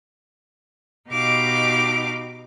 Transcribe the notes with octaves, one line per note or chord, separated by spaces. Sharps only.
B2 D#4 G4 F5 D6